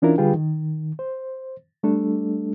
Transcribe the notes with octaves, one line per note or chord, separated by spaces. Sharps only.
E3 C#4 D4 E4 F4 A#4
D3 G3 F4 G#4 B4 G5
D#3
C5
G3 A3 D4 A4